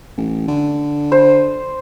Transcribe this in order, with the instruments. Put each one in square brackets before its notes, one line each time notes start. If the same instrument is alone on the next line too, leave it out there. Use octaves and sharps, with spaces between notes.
[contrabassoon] A1
D3
[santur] C5